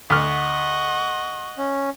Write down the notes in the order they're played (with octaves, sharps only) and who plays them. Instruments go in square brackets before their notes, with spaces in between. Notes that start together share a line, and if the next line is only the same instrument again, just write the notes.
[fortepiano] D2 F6 [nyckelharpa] D#5 F#5 [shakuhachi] C#6
[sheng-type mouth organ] C#4